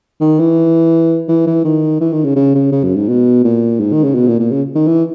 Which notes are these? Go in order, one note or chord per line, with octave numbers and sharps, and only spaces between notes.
D#3
E3
E3
E3
D#3
E3
D#3
C#3
C#3
C#3
C#3
F#2
G#2
B2
A#2
G#2
D#3
C#3
B2
A#2
A#2
C#3
D#3
E3